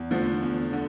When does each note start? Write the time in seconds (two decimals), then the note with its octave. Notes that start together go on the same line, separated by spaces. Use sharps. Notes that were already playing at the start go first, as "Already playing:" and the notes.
Already playing: E2
0.11 D3 F3 A3
0.42 E2
0.73 D3